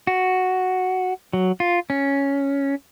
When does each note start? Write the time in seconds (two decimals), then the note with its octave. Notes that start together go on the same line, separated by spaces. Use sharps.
0.07 F#4
1.33 F#3
1.60 F4
1.90 C#4